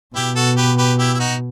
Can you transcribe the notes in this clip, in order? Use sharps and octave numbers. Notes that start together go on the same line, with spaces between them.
B2 E4 G4
F#4 A4
G4 B4
G4 B4
E4 G4
E4
D#4 F#4